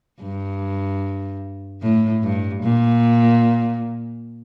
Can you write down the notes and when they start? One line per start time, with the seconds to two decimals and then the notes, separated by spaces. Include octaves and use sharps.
0.20 G2
1.82 A2
2.23 G2
2.63 A#2